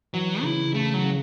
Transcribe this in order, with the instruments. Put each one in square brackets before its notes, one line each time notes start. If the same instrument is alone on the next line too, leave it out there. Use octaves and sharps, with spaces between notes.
[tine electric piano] E3 [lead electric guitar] F#3
[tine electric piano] C#3 [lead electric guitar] E4
[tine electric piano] C#3 [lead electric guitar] A3
[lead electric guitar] F#3
[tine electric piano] C#3